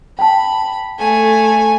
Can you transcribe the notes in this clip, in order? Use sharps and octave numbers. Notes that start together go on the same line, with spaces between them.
G5 A5 B5
A3 G#5